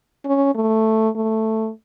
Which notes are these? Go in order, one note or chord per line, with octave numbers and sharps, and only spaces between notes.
C#4
A3
A3